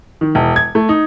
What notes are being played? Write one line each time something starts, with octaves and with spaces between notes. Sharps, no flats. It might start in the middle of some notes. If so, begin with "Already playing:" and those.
D#3
E1
G#6
A3
D#4